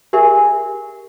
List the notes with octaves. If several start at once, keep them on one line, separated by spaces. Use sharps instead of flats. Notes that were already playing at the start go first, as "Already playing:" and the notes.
G4 G#4 A#4 E5